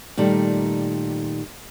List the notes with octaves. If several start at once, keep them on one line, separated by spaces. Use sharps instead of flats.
A#2 D#3 G3 A3